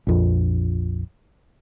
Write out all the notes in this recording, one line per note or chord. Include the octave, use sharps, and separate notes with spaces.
A#1 F2